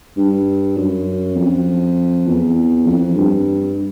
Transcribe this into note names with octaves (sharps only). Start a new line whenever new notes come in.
G2
F#2
F2
E2
F2
G2